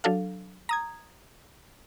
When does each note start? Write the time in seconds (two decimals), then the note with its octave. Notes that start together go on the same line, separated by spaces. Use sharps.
0.04 F#3 D4 A4 F5
0.69 A#5 D#6 G#6